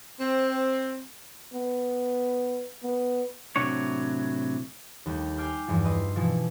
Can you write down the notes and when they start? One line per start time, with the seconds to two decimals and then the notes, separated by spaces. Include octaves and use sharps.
0.20 C4
1.54 B3
2.84 B3
3.56 A2 C3 F#3 D4 C#5
5.06 D#2 G3 A3 G5
5.36 G5 G#5 D6 F6 G6 C7
5.67 E2 G2 E3 F3
5.84 B4 D#5 C6
6.16 B2 E3 F3